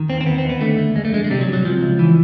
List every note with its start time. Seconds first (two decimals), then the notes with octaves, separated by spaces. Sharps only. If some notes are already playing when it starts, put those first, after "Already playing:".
Already playing: D#3
0.09 D#2 C4
0.21 C4
0.26 D#2 B3
0.38 C4
0.44 D#2
0.49 B3
0.61 D3 A3
0.78 D3
0.95 F2 G#3
1.05 A3
1.13 D3 G#3
1.24 G#3
1.30 C3 G3
1.41 F#3
1.48 C3
1.53 F#3
1.65 C#2 F3
1.83 C#2
1.99 E3